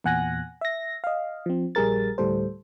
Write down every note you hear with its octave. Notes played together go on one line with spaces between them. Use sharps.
E2 A#2 F#5 G#5 F#6 A#6
E5 A#6
D#5 F5
F3 C4
A#1 G3 G#4 A#4 A6
D2 A2 G3 A4 C5